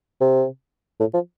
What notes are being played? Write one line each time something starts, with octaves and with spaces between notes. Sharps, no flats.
C3
A2
F3